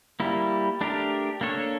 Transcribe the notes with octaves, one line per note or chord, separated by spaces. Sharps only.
G3 A#3 E4
A3 D4 G4 A#4
A#3 D4 A4 C#5